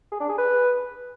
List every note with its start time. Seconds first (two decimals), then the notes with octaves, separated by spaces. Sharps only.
0.12 G#4
0.20 D4
0.29 G#4
0.38 B4